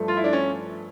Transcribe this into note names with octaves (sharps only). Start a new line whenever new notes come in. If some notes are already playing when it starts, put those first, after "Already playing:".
Already playing: G2 F3 A3
F4
E4
D4
C#4